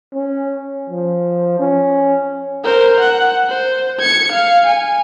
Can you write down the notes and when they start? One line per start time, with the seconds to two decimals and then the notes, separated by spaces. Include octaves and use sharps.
0.13 C#4
0.90 F3
1.59 C#4
2.64 A#4 C5
3.00 F#5
3.49 C5
3.99 G#6 C#7
4.32 F5
4.66 G#5